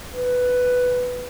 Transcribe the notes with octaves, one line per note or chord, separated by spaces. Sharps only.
B4